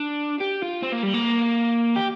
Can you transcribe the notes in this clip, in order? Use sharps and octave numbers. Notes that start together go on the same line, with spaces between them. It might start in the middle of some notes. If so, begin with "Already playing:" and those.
Already playing: D4
G4
F4
C4
A#3
G3
A#3
G4